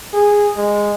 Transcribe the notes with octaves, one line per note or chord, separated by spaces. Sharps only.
G#4
G#3